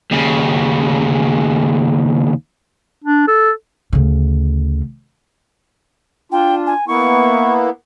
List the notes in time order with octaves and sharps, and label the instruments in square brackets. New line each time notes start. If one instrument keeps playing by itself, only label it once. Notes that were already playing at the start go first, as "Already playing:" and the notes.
[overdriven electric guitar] D#2 C#3
[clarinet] D4
A4
[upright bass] D2 C#3
[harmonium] D4 F4 [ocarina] G5
[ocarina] G#5
[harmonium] A#3 B3 E4 [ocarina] C#6